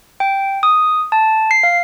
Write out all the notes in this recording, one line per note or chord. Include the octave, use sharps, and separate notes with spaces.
G5
D#6
A5
C7
F5